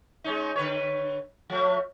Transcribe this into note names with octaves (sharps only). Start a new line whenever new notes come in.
G#3 C#4 D#4
D3 B4 C#5
F3 A3